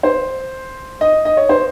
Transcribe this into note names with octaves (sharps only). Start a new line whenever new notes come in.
C5
D#5
D#5
C#5
C5